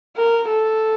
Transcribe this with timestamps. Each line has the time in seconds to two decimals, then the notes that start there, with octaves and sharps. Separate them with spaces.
0.17 A#4
0.49 A4